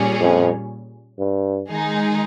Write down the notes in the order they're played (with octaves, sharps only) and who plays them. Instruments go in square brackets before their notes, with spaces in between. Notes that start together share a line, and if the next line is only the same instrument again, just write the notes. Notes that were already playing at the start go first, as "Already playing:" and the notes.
Already playing: [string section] A#2 G3 C#4 G#4
[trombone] F2
G2
[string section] D#3 G#3 D#4 G#4